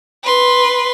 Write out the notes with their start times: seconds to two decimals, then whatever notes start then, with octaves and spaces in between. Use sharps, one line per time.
0.24 B4 C6